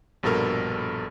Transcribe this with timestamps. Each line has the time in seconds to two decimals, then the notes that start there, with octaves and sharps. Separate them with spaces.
0.23 A#1 G2 B2 A4 A#4 F6